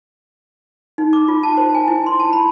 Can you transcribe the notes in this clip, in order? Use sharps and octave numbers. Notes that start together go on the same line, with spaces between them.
D#4
D6
F4
A5
C5
G#5
E4
C6
A5
B5